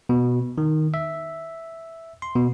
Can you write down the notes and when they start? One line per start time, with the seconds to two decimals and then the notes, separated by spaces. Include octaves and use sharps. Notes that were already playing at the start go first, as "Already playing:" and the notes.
0.09 B2
0.58 D#3
0.94 E5
2.22 C6
2.36 B2